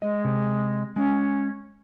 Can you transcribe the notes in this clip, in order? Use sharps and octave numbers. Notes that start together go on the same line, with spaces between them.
G#3 D#5
C3
G#3 C#4